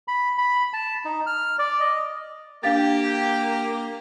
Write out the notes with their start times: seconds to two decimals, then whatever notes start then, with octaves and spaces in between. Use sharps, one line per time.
0.08 B5
0.38 B5
0.73 A5
1.05 D#4
1.26 F6
1.59 D5
1.80 D#5
2.63 A#3 D4 G4 F5 A6